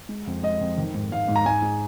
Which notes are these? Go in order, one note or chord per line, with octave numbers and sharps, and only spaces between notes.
G#3
F2
G#3 D#5
F2
D#3
G#2
G#2 F5
G#2
A#5
G#3 G#5
G#3